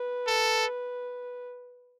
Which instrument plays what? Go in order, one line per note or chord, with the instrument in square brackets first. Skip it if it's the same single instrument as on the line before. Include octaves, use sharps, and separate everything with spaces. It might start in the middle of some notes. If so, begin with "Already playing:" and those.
Already playing: [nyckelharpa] B4
[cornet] A4